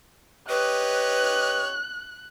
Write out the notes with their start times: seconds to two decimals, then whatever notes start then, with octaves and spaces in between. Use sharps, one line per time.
0.49 G4 B4 C#5 D#5 F#6